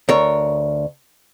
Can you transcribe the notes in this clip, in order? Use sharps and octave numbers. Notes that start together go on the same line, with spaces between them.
D2 A#4 C#5